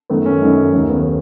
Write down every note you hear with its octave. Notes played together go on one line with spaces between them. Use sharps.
F#2 D#3 A3 B3
C#4
F#2 D#3 A3 D#4
D#2 D#3 A3 C#4
B3